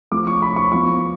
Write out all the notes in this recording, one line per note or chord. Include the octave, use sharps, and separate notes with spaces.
F3 A3 F4 D6
C#6
B5
C#6
F3 B3 F4 C#6